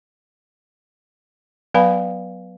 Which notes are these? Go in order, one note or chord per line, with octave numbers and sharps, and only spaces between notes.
F#3 B3 B4 F5 G#5 B5